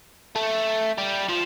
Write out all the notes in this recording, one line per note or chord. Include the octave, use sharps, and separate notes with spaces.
A3
G3
F3